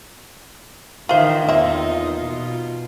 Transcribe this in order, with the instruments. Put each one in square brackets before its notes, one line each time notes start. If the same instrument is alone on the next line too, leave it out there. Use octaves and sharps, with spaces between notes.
[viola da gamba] D#3 E3 [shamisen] F4 C5 E5
[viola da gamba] E2 D#4 F4 [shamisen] A#3 C4 E5
[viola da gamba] B2 F4